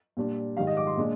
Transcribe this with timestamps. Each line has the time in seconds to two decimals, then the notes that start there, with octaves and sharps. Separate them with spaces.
0.17 A#2 G3 D4
0.57 G#2 D#3 G3 F5
0.67 D#5
0.77 D6
0.87 C6
0.97 A#2 G#3 D4